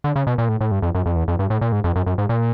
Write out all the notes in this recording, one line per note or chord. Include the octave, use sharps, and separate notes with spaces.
D3
C#3
B2
A#2
A2
A2
G2
F2
F#2
F2
E2
F2
G2
A2
A#2
G#2
F2
F#2
F#2
G#2
A#2